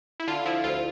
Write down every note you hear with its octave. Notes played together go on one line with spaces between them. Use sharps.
E4
D3 F4
F3 E4
D2 F4